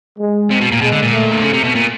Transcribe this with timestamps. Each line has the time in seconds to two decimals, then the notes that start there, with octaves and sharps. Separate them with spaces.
0.19 G#3
0.50 C3
0.61 B2
0.72 A#2
0.81 B2 G#3
0.92 D3
1.02 A#2
1.13 A3
1.32 D3
1.43 C#3
1.53 C3
1.64 B2
1.75 A#2